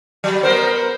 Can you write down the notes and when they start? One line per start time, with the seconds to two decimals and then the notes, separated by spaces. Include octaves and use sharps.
0.24 F#3
0.43 B3 A#4 C5